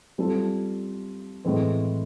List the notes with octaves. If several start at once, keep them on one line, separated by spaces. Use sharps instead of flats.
G3 C4 F4 A4
A2 E3 G#3 C4